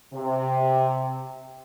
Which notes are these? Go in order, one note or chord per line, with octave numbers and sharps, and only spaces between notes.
C3